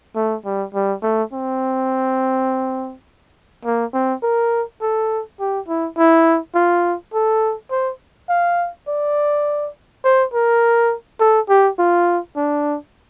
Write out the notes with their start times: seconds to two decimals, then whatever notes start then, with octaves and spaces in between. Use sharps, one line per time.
0.16 A3
0.45 G3
0.74 G3
1.03 A3
1.33 C4
3.65 A#3
3.94 C4
4.23 A#4
4.82 A4
5.40 G4
5.68 E4
5.98 E4
6.55 F4
7.14 A4
7.71 C5
8.29 F5
8.88 D5
10.05 C5
10.34 A#4
11.20 A4
11.49 G4
11.79 F4
12.37 D4